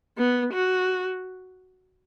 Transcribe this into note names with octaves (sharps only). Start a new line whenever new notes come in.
B3
F#4